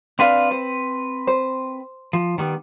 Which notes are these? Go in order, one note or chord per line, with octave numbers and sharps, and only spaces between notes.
C4 D4 B4 D5 F5
C5
C5
F3
D#3 G3 B3